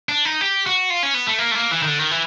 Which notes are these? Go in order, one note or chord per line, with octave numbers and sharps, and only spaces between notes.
D4
D#4
G4
F#4
F4
C#4
B3
A3
A#3
A3
A#3
E3
D#3
D3
D#3
E3